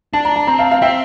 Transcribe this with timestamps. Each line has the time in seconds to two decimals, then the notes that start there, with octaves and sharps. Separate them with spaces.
0.13 D4 A5
0.25 A#5
0.36 A5
0.47 C4 A#5
0.59 F5 A5
0.71 F5
0.82 C4 E5 G5